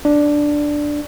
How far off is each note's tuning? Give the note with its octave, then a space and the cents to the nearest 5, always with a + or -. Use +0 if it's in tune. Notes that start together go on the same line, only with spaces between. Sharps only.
D4 +0 D5 +0